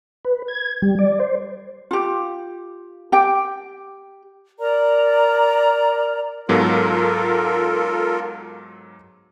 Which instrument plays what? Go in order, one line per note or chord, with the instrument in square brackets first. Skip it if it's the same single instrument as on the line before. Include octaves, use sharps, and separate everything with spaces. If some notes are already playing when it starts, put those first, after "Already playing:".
[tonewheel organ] B4
G#6
G3
D5
C5
[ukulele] F4 G4
G4 G5
[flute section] A#4 D5 A#5
[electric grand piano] G#2 F#3 B3 [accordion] F4 A4 A#4